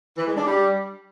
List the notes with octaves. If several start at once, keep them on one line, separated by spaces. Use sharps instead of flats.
E3
G#3
D4
G3